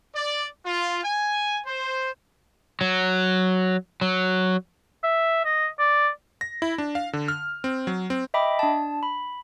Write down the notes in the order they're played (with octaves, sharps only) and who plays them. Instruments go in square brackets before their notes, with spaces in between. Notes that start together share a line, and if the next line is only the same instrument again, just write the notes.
[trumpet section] D5
F4
G#5
C5
[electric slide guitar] F#3
F#3
[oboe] E5
D#5
D5
[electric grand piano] A#6
E4
D4
F5
D3
F6
C4
F#3
C4
[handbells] D#5 E5 G5 B5 D6
D4 A5
B5